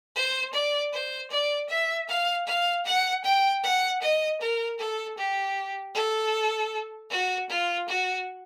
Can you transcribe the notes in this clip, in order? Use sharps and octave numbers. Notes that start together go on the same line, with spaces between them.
C5
D5
C5
D5
E5
F5
F5
F#5
G5
F#5
D#5
A#4
A4
G4
A4
F#4
F4
F#4